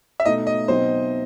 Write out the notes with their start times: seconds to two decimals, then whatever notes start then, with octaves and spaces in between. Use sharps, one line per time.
0.20 E5
0.25 B2 A3 D#4 D#5
0.47 D#5
0.68 B2 F#3 C4 D#4 C5